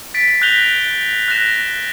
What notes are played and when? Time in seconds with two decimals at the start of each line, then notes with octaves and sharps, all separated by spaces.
0.14 A6 B6 D7
0.42 F#6 G6 A#6 B6 F7 G7
1.28 F#6 A#6 E7